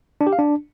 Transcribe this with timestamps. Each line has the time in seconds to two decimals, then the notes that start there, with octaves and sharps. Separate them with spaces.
0.21 D4
0.27 G4
0.33 F5
0.39 D4